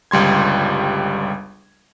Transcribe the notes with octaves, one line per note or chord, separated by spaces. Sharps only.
G1 C#2 G3 C6 G#6